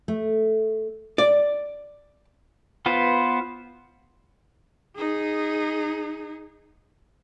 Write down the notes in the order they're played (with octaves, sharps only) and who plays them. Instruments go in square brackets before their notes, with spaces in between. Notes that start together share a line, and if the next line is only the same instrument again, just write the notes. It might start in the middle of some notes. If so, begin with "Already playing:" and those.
[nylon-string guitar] A3
[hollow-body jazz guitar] D5
[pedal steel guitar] B3 F4 B4 C5
[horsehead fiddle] D#4 G#4